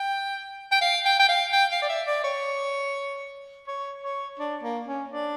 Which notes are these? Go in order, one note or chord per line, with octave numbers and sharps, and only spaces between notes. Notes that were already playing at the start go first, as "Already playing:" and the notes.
Already playing: G5
G5
F5
G5
G5
F5
G5
F5
D5
E5
D5
C#5
C#5
C#5
D4
A#3
C#4
D4